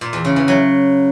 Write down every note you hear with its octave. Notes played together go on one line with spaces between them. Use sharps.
A#2
E2
C#3
E3
F#3